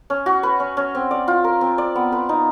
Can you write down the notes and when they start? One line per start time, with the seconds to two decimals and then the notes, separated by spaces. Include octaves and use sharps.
0.10 C#4
0.26 F#4
0.43 B4
0.60 C#4
0.77 C#4
0.95 C4
1.11 D5
1.28 F4
1.44 A#4
1.61 C4
1.78 D5
1.95 B3
2.12 B4
2.29 D#4